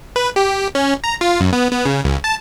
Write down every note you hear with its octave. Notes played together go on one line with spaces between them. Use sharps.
B4
G4
C#4
A#5
F4
F#2
B3
B3
C#3
C#2
A5